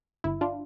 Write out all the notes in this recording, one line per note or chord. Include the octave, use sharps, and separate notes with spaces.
G1 E4
D4 F4